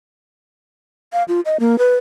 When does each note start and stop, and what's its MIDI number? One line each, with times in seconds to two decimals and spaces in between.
1.13 1.23 77
1.28 1.40 65
1.45 1.57 75
1.60 1.78 58
1.78 1.96 71